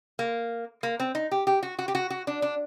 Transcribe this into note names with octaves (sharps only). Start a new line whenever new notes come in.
A#3
A#3
C4
D#4
G4
G4
F#4
F#4
G4
F#4
F#4
D4
D4